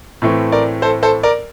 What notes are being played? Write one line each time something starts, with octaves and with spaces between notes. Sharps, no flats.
A2 E3 A3 C4
A#4 D5
A4 C5
A4 C5
A#4 D5